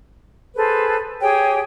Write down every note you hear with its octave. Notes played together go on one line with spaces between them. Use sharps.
G#4 A4 B4 C5
G4 G#4 C#5 G5